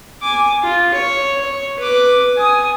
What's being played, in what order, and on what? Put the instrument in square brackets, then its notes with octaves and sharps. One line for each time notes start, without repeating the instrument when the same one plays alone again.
[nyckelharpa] G#5 D6
F4
C#5
C#5
B4 D6
G#5 D#6